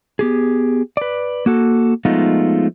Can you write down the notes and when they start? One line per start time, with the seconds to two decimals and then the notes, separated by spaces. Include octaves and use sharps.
0.19 B3 G4 G#4
0.97 B4 D5
1.46 A#3 F#4 A4
2.05 F3 G#3 A3 B3 D#4 F4